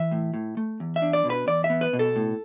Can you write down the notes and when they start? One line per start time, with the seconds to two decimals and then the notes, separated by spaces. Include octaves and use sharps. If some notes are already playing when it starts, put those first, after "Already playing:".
Already playing: E3 E5
0.12 A2
0.34 A2
0.57 A3
0.80 E2
0.96 E5
1.02 D4
1.13 D5
1.25 B2
1.30 B4
1.47 E2 D5
1.64 E5
1.70 B3
1.81 B4
1.93 B2
1.99 A4
2.16 A2